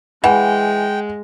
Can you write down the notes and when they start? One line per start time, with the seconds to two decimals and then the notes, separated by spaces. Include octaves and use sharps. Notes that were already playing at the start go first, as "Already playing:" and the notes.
0.24 E3 G#3 F#5 G5